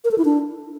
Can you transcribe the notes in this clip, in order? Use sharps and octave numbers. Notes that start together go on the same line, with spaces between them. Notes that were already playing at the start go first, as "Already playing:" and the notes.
A#4
A4
E4
D4